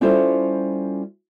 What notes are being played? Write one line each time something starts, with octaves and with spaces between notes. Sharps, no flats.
G3 C#4 E4 F4 A4 C5